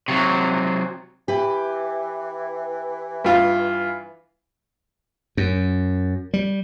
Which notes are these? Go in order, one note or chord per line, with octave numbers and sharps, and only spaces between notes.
C3 F#3
E3 G4 B4
G2 F4
F#2
G3